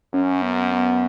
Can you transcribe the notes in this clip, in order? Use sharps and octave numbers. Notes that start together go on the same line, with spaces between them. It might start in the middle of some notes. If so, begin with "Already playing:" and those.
F#2 C#4
B3
B3